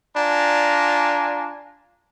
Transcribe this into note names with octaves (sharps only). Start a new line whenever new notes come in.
D4 F4 G#5 A#5